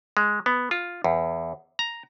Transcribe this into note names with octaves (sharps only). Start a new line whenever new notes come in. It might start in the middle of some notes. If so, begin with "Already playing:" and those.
G#3
B3
F4
E2
A#5